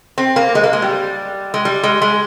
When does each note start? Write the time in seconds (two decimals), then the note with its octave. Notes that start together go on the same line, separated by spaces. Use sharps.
0.18 C4
0.36 A#3
0.55 G#3
0.64 A#3
0.73 G#3
0.82 G3
1.54 G#3
1.65 G3
1.83 G#3
2.02 G#3